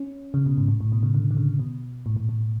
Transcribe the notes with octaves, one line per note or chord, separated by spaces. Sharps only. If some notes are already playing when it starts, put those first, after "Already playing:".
Already playing: C#4
C#3
B2
G#2
A2
A2
B2
C#3
D3
D3
C#3
B2
A2
A2
A2